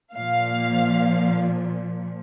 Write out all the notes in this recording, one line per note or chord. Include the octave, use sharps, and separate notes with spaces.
A#2 F3 F5